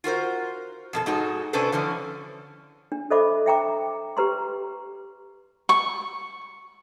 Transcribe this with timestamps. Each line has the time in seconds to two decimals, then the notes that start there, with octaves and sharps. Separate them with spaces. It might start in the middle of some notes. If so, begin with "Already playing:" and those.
0.04 F4 F#4 A#4 C5
0.93 F2 B2 A4
1.06 G#2 G#3 D#4 F#4 A4
1.53 C3 C#4 D4 A4 B4 C5
1.72 D3 E3 F3 C#4
2.92 D4
3.10 A4 C5 D#5 E5 B5 D6
3.46 E5 G5 A#5 D6
4.17 G4 B4 A#5 C6
5.69 C#6